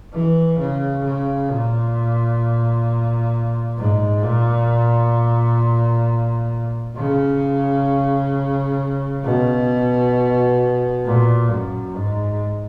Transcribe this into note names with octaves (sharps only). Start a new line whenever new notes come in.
E3
C#3
C#3
A#2
G#2
A#2
C#3
B2
A#2
F#2
G#2